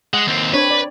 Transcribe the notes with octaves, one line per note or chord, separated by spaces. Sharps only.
G#3 F#5
D#2 C4
C4 D4 B4 C#5
D5